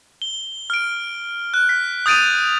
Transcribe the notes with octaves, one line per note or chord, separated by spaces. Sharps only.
G7
F6 D7
F#6
B6
D#6 G6 A6 D7 D#7 F7